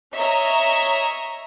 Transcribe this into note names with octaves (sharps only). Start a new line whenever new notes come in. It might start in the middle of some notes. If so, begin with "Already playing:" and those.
C#5 D#5 E5 A#5